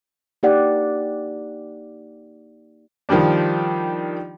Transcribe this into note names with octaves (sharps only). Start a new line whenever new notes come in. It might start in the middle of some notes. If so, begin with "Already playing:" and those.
A#3 D#4 G4 D5 F#5
D#3 F3 G3 D4